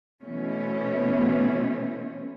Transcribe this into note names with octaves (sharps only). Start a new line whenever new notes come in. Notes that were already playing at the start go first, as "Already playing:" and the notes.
B2 E3 A3 C4 C#4